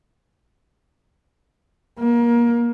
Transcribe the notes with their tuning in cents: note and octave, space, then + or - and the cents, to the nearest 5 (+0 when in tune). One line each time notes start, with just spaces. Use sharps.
A#3 +25